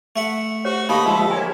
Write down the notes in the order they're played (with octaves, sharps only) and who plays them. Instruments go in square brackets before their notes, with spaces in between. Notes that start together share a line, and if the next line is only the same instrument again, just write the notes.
[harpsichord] A3 E5 F#5
[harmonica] F#4 [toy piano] G4 C5 C#5
[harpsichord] D3 A#3 [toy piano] D#4 G4 A#5 [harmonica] D#5 B5
[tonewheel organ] F3 G#3 E5 [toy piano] D#4 C6 [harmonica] A4
[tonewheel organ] G4 A#4 C#5 [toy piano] G#5